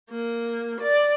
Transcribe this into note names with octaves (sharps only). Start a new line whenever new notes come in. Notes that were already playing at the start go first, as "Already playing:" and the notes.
A#3
D5